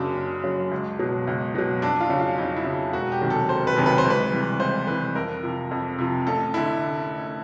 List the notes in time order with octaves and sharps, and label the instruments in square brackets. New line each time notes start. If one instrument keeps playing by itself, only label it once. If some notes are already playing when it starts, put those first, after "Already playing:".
Already playing: [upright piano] F#1 F#2 C#3 F#3 D4
F#1
F#2 C#3 F#3
C#2
B2 F#3
C#2
B2 F#3
F2 D4
F4
C#3 F#3
F4
F2 D#4
E4
C#3 F#3
E1 F#4
G4
D2 C3 D#3 F#3
A4
E1 C5
B4
D2 C3 D#3 F#3
B4
C5
C#2
B4
C3 E3 G3
C#2 C5
C3 E3 G3 B4
F2 A#4
C3 F3
F2
C3 F3
A1 A4
D3 E4